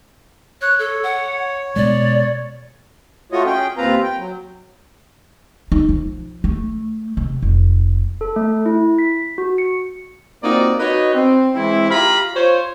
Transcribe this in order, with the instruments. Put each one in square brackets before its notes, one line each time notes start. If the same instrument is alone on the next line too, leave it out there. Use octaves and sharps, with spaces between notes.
[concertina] C#5 [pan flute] F#6
[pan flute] A4
F#5
[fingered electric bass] B2 G#3 [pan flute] D5
[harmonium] A3 F4 F#4 C#5 D#5
C#4 G#4 G5
D#2 C4 F4 B4 F5 A#5
G5
F#3
[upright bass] D#4
F3
A3
C3
F1
[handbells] A4
A3
E4
B6
F#4
C#7
[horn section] A#3 C4 D#4 F4 F#4 D5
D#4 F#4 B4 C#5 D#5
C4
E3 G#3 C4 E4
F4 G4 F5 A#5 B5
F4 C5 C#5